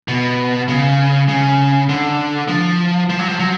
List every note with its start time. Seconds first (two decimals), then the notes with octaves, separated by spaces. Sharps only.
0.08 B2
0.69 C#3
1.29 C#3
1.89 D3
2.48 F3
3.10 F3
3.19 F#3
3.29 F3
3.39 F#3